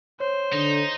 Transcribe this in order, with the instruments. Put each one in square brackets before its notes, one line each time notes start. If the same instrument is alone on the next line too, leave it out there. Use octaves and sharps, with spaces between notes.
[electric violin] C5 [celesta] C#5
[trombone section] D3 [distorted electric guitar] D#4